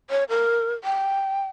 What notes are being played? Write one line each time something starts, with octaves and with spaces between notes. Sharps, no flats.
C#5
A#4
G5